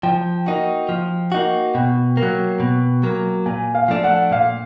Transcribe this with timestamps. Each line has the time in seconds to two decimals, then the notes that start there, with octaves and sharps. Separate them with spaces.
0.03 F3 G5
0.46 A#3 D#4 F#4
0.89 F3
1.32 A#3 D#4 F#4
1.75 B2 G5
2.17 A#3
2.23 F#3
2.60 B2
3.03 F#3 A#3
3.46 A#2 G#5
3.75 F5
3.88 F3 A3 D4
4.04 F#5
4.31 A#2 F5